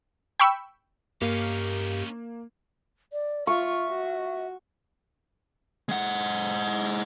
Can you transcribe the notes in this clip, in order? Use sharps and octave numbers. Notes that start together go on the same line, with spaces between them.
G5 B5 C#6 E6
G2 A#3 C#4 D#4 G4 F5
D5
F4 E5 C#6
F#4
G#3 F#5